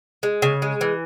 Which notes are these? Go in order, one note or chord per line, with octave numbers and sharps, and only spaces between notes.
G#3
C#3
G#3
E3